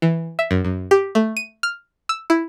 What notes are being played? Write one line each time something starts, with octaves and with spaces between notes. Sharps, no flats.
E3
E5
F#2
F#2
G4
A3
D#7
F6
E6
E4